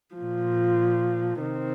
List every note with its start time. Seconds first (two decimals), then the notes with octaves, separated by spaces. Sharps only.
0.16 A#2 F3
1.41 C3 D#3 C4